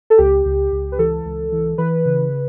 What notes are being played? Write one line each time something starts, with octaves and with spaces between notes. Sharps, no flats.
A4
C#2 G4
C#2
C#2
B4
E3 A4
C#2
E3
E3 B4
C#3